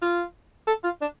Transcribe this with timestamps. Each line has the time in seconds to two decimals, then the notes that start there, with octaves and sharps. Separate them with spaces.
0.02 F4
0.67 A4
0.84 F4
1.01 D4